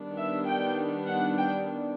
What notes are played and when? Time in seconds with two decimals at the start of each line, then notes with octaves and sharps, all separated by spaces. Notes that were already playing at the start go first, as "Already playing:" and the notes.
Already playing: D#3 G3 B3 D4
0.16 E5
0.46 G5
1.07 F#5
1.37 G5